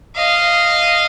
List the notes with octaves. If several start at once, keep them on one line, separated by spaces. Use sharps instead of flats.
D#5 F5